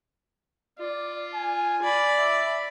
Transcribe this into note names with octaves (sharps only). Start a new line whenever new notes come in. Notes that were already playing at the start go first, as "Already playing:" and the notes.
F4 D5
G#5
D5 B5
E5